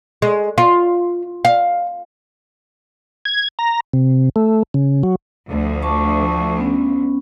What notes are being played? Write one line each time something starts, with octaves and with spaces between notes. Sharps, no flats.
G#3
F4
F5
G#6
A#5
C3
A3
C#3
F#3
D2 F3
A5 C#6 D6
B3 C#4